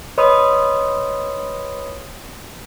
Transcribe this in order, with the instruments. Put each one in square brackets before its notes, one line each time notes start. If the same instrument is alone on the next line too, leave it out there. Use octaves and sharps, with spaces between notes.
[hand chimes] B4 C#5 D#5 B5 C6 D#6